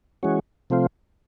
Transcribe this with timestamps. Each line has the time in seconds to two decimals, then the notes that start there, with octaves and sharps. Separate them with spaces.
0.23 E3 G#3 C#4 F#4
0.70 C3 F3 A3 C4 F4